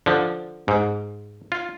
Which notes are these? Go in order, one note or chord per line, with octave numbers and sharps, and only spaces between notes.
D3 F3
G#2
F4